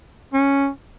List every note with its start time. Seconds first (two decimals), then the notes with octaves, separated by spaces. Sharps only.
0.33 C#4